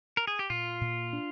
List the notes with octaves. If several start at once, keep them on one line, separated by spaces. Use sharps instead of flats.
A#4
G#4
G4
A#2 F4
A#2
D4